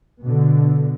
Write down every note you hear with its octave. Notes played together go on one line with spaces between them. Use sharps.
B2 D3